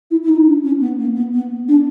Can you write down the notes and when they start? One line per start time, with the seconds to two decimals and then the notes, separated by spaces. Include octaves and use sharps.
0.11 E4
0.24 E4
0.29 D#4
0.46 D4
0.64 C#4
0.80 B3
0.99 A#3
1.15 B3
1.33 B3
1.68 D4